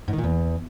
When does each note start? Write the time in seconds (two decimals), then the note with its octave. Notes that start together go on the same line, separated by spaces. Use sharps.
0.08 G#2
0.13 D#3
0.18 A#2
0.24 E2